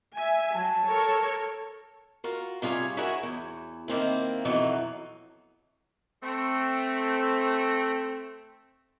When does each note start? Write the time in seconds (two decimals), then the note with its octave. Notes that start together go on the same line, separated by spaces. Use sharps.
0.16 E5 G#5
0.55 F#3 A5
0.86 A4 A#4 C#5
2.24 F4 F#4 A#4
2.62 C3 G3 F4 G#4 C#5
2.97 E4 F#4 G#4 A#4 C#5 E5
3.23 E2
3.88 D#3 A#3 C4 E4
4.45 F2 B2 E3 F#3 D#4
6.22 A3 C4